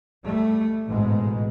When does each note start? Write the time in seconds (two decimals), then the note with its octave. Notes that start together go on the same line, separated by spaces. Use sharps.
0.23 G3 A3
0.87 A1 G#2 B2 G#3